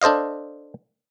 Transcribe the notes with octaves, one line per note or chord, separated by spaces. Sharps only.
D4 A4 C5 D#5 F5